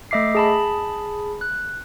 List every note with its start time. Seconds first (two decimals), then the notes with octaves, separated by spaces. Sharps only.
0.11 A3 D#5 E5 D6 C7
0.35 G#4 A5 B5
1.41 F#6